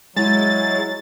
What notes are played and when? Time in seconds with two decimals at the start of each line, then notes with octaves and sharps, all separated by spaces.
0.16 F#3 G#3 E4 A6